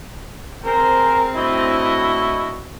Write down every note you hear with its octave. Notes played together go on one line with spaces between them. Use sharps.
C4 G#4 A#4 C5
A2 D4 E4 F#4 D#5